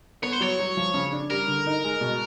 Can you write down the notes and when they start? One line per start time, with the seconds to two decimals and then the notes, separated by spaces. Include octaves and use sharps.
0.23 B3 C#5
0.32 C5
0.40 F#3 C#5
0.59 F#3
0.77 F3
0.94 C#3
1.12 D4
1.30 G3 A#4
1.48 D3
1.66 D#4
1.84 G#3
2.01 B2